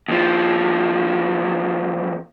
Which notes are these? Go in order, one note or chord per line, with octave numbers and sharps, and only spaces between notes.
D#2 F3